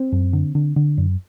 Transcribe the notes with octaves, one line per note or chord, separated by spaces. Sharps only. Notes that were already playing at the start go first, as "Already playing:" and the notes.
Already playing: C4
F#2
D3
D3
D3
F#2